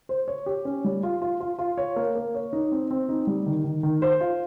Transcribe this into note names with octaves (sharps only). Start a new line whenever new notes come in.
C5
C#5
G4
C#4
G3
F4
F4
F4
F4
C#5
A#3
A#3
C#5
D#4
C4
C4
D#4
G3
D#3
D#3
D#3
C5
F4